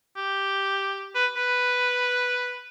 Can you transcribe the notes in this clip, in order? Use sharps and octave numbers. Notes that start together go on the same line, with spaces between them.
G4
B4
B4